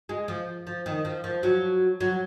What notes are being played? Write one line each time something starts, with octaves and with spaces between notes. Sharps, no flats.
G#3
F3
F3
D#3
F3
F3
F#3
F#3